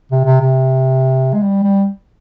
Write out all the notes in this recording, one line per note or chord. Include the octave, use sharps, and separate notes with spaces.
C3
C3
C3
G#3
G3
G3